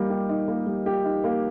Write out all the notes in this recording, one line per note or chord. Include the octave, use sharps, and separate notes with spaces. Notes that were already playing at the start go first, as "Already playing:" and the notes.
Already playing: G3 A#3 D#4
G4
D#4
A#3
G3
G4
D#4
A#3